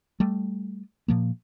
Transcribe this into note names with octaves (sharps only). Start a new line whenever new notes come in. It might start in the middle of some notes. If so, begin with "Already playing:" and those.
G3 A3
A#2 F3 A#3